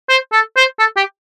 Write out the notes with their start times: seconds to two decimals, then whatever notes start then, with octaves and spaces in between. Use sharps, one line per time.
0.09 C5
0.32 A4
0.57 C5
0.79 A4
0.97 G4